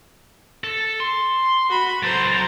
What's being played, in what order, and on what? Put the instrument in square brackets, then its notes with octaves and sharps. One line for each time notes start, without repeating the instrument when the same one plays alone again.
[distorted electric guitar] A4
C6
[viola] F#4 B5
[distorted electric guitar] F#3 A4 [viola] C5 A#5